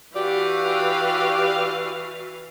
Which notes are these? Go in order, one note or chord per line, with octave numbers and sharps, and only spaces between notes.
E3 F#4 G4 D5 F5